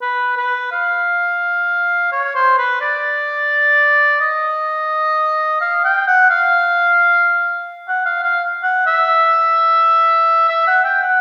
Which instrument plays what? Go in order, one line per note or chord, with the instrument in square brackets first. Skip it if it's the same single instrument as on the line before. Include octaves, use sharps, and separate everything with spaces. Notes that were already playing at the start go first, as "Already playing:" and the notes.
[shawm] B4
B4
F5
C#5
C5
B4
D5
D#5
F5
G5
F#5
F5
F#5
F5
F5
F#5
E5
E5
F#5
G5
F#5